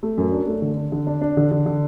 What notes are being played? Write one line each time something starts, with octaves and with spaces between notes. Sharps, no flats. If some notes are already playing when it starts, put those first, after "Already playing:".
A3
F#2
D4
A3
D3
D4
D3
D4
D4
D3
D3
D3